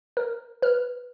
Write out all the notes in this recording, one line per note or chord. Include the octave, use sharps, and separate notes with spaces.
A#4
B4 F6